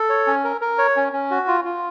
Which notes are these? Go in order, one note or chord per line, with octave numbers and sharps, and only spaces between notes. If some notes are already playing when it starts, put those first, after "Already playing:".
Already playing: A4
C#5
C#4
A#4
A#4
C#5
C#4
C#4
F#4
F4
F4